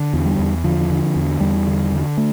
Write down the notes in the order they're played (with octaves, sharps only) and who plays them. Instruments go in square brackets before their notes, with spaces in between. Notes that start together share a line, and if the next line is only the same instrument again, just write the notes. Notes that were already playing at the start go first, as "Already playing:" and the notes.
Already playing: [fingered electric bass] D3
E2
G3
E2
D3 F3
D3
E2
E2 G3
D3
D3
A3